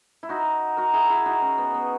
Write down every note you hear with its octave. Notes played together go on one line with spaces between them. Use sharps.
E4
D#4 F#4
F#4 A#4
E4 G#4
E4 G#4
D#4 F#4
C#4
B3
B3